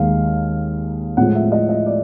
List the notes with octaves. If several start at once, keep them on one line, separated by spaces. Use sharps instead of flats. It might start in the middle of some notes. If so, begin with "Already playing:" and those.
Already playing: D#2 D#3 G#3 F5
A2 F3 G#3 F#5
E5
D#5
D#5
D5